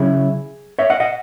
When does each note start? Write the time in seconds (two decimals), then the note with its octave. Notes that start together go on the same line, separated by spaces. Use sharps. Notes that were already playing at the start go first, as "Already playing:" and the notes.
Already playing: C#3 F#3 C#4 E4 G#4
0.79 C#5 E5
0.90 D#5 F#5
1.00 D#5 F#5